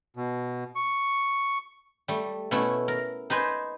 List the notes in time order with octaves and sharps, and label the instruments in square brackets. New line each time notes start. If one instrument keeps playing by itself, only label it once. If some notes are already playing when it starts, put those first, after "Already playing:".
[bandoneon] B2
C#6
[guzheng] G3 A3
B2 A3 C#4 E4
A#4
D#4 B4 C5 G#5